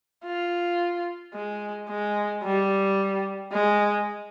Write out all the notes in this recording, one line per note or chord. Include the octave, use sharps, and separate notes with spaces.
F4
G#3
G#3
G3
G#3